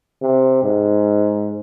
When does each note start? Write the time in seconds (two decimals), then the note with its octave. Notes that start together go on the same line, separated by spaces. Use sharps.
0.22 C3
0.63 G#2